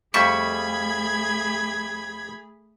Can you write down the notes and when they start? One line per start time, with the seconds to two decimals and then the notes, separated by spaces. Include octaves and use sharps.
0.14 F2 G3 A3 G#4 E5 B5 C#6 G#6